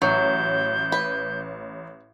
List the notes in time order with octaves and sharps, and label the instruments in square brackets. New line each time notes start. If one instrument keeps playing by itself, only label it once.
[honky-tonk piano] A1 [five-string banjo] F#3 [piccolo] G6
[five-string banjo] B4